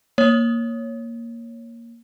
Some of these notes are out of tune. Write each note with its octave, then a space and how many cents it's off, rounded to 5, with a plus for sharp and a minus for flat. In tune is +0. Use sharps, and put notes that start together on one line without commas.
A#3 +0 C#5 +0